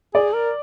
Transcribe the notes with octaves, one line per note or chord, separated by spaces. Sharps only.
G#4 D5
A#4